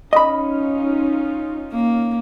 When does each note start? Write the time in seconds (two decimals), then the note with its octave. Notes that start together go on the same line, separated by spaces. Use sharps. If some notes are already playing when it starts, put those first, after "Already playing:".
0.13 C#4 D#4 F4 D#5 B5
1.72 A#3